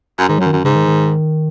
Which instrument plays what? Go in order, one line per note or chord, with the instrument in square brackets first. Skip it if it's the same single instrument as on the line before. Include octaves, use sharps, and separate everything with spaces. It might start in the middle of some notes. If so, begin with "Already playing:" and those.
[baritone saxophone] F#2
[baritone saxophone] G#2 [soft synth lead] D#3
[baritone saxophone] F#2 [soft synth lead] F#3
[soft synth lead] D#3
[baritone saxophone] F#2
[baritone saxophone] G#2 [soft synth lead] C#3
[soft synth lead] D#3
D#3